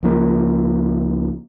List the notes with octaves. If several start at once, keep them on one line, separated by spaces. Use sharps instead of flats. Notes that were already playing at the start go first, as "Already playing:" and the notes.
C#2 F3 A#3